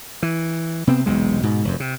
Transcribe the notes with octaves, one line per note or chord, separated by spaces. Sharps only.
E3
C3 B3 C4
E1 B1 C3 G#3
G#2 B2
F1 F#2
C3